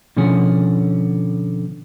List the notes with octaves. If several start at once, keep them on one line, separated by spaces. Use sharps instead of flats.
B2 D3 F3 B3 C#4 G#4